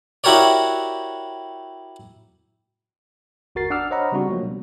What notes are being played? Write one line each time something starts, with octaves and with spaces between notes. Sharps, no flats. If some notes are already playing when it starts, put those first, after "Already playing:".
E4 F#4 G4 A#4 C#5 D5
G1 D#2 F#4 A#4 A6 C7
D4 F#5 D6 E6 F6
C5 C#5 D#5 F#5 A#5 B5
C#3 G3 C4 D4 F#4
F3 F#3 A3 A#3
B2 G3